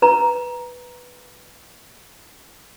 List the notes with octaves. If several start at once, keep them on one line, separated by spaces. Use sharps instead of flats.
B4 A#5